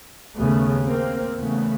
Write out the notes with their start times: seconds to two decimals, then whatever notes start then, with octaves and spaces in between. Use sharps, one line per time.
0.37 D#2 C#3 A3 B3
0.87 A#3 C4
1.38 E2 C#3 A3 B3